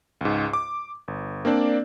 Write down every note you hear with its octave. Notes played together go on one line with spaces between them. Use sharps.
C#2 G#2
D6
G1
A#3 C4 D4 D5